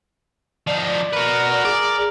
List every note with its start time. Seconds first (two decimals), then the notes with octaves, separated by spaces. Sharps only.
0.67 F3 D#4 D5
1.13 F#4 A#4 B4
1.65 G#4 D5